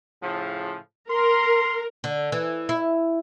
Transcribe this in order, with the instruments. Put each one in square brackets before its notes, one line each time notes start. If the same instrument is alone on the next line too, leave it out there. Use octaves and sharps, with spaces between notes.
[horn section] A2 C#3 F3
[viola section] A#4 [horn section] C6
[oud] D3
E3
E4